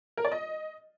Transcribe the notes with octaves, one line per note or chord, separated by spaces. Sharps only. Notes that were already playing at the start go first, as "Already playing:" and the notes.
A#4
D5
D#5